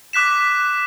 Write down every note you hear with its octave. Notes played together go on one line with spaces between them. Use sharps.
D6 F#6 B6 E7